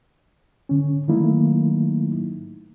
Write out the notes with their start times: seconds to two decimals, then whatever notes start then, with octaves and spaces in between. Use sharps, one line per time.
0.69 D3 C#4
1.08 D#3 F#3 A3 A#3 D#4 E4